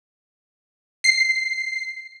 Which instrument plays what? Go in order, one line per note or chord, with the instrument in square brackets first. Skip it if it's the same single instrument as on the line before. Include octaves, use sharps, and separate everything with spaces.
[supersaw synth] C7